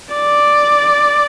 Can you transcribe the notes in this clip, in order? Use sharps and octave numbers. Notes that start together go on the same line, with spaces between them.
D5